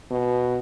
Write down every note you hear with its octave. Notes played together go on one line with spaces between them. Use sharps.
B2